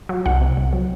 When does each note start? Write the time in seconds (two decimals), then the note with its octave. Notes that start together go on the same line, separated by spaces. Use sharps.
0.09 F#3
0.26 C2 F#5
0.41 C3
0.57 C2
0.73 F#3